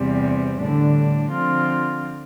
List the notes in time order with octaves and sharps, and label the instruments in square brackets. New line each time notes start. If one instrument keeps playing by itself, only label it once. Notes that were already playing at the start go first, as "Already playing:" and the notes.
Already playing: [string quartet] E2 C3 G3 C4
[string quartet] A2 G3 D4 [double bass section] D3
[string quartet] D3 F3 C4 F4